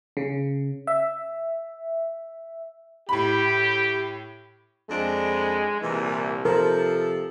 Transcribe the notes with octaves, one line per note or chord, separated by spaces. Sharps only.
C#3
E5
A2 G4 B5
F2 G#3 D4
C2 A#2 E3
C3 F3 A4 A#4